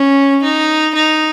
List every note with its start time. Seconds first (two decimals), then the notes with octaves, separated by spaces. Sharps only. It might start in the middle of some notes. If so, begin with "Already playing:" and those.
Already playing: C#4
0.43 D#4
0.95 D#4